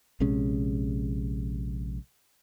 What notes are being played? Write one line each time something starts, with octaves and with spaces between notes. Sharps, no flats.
A#1 C3 G#3 C#4